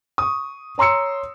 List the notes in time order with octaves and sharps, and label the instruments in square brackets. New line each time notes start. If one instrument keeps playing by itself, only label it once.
[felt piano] C#6 D#6
C#5 A#5 C6 E6 C#7